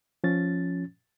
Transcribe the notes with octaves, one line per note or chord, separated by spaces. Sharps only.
F3 C#4 A6